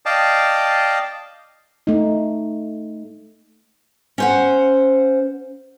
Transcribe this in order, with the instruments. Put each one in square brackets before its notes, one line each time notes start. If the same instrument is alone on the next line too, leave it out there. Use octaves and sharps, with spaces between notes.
[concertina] D5 D#5 F5 G5 A5
[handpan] A3 D#4
[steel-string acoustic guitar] C#4 C5 F#5